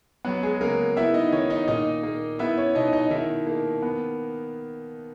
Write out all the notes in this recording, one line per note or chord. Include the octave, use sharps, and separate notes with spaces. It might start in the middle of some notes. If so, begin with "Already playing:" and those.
F#3 B3 F#4
G#3 G#4
C#3 A#3 A#4
B3 E4 E5
D#4 D#5
D#3 C#4 C#5
D#4 D#5
A#2 D#4 D#5
A#3
B3 E4 E5
C#4 C#5
B2 D#4 D#5
D#4 D#5
D#3 E4 E5
A#3
B3